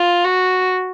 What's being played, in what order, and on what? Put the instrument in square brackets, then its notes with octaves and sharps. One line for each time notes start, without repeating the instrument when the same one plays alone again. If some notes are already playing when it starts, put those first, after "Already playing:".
Already playing: [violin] F4
F#4